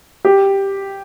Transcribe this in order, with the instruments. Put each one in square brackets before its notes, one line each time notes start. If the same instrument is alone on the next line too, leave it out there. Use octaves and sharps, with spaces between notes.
[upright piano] G4